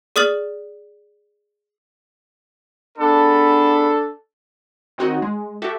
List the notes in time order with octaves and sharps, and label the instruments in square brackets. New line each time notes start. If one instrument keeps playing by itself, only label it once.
[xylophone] G#4 D5 D#6 F6 A6 F#7
[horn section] B3 G#4 B5 [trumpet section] D4 A4
[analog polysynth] D#3 C4 D#4 F#4 C#5 D#5
G#3
F#4 G4 A4 E5